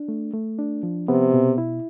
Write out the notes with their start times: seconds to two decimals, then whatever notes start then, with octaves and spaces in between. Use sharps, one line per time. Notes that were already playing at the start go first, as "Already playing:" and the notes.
Already playing: D4
0.08 A3
0.34 A3
0.59 D4
0.83 F3
1.08 C3 B3
1.34 B2
1.58 E4